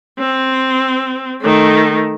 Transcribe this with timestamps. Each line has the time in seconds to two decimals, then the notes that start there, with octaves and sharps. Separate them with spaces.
0.19 C4
1.41 D#3 A3